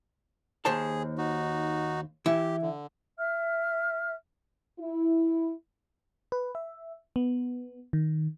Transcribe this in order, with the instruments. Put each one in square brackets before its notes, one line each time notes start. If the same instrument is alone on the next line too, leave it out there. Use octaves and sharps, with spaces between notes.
[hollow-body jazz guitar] D#2 C5 A5 [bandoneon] G#4
[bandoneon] D#4 F#4
[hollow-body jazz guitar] E3 E4 [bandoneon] G4
[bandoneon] D3
[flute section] E5 F6
[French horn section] E4
[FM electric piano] B4
E5
B3
D#3